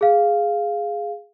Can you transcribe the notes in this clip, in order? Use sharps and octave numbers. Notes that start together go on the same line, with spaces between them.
G#4 F5